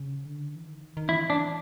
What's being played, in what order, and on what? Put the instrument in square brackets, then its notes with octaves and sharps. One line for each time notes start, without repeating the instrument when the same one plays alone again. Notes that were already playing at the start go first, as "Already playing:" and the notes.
Already playing: [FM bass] C#3
D3
E3
D#3
D#3
[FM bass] E3 [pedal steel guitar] E4
[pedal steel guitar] D4